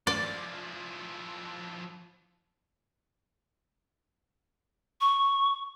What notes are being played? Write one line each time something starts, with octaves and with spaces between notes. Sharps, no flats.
F3 E4 D5
C#6